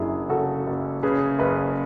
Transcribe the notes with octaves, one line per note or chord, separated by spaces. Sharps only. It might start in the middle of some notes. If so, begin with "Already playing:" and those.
Already playing: F#1 F#2 D4 E4 F#4 G#4
C#3 F#4 A4
F#1
C#3 G#4 B4
F#1 G#4 B4